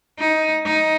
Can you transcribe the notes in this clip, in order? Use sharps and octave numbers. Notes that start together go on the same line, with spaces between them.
D#4
D#4